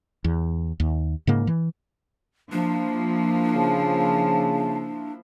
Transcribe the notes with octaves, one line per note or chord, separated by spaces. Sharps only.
E2
D#2
G#2 C#3 A#3
E3
F3 A#3 D4 E4
C#3 A5